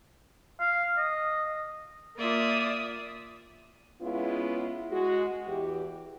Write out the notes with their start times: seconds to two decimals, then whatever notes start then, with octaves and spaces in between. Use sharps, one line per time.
0.60 F5
0.98 D#5
2.17 A#3 F4 D5 E5 D#6
4.02 G#3 B3 C#4 E4 F4
4.91 G#3 F#4
5.47 E2 E3 G4